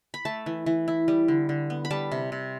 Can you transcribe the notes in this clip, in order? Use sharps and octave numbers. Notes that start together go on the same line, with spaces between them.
B5
A3 A5
E3
E3
E4
G3
D3
D3
B3
B5
G3 A5
C3
C3